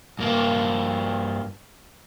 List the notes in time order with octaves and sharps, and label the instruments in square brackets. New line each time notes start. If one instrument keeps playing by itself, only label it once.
[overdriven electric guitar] G2 A#3